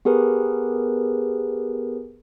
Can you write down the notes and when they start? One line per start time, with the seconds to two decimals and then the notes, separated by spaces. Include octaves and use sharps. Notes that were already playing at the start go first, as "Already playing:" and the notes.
0.05 B3 G4 G#4 A#4 B4